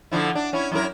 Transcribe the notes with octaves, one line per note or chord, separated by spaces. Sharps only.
D3 F3 E4
D4
C#4 E4
F#2 E4 A#4